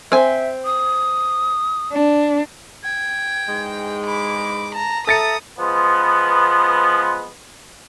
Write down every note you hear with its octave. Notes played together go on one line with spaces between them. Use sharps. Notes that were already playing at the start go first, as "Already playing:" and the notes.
C4 E5 G#5
D#6
D4
G5 G#6
E2 G#2 G#3
B5 D6
A5 A#5
A4 E5 A#5 D#6 A6 C#7
F3 G#3 B3